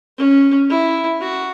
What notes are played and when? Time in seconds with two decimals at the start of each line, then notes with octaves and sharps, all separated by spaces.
0.18 C#4
0.70 E4
1.21 F#4